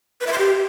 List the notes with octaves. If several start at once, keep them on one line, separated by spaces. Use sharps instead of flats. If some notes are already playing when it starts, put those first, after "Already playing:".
B4
E5
C6
G4